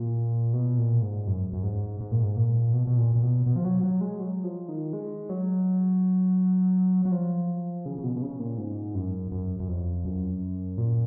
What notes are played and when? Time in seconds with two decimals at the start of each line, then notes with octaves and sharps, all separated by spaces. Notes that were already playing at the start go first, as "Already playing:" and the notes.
Already playing: A#2
0.54 B2
0.78 A#2
1.02 G#2
1.27 F#2
1.53 F#2
1.63 G#2
2.01 G#2
2.11 A#2
2.23 G#2
2.36 A#2
2.74 B2
2.87 B2
2.97 A#2
3.15 A#2
3.22 B2
3.46 B2
3.56 F3
3.65 F#3
3.83 F#3
4.01 G#3
4.20 F#3
4.44 F3
4.68 D#3
4.93 G#3
5.29 F#3
7.05 F#3
7.12 F3
7.86 C#3
7.98 C#3
8.03 B2
8.16 B2
8.22 C#3
8.39 A#2
8.58 G#2
8.95 F#2
9.32 F#2
9.60 F#2
9.68 F2
10.05 F#2
10.78 A#2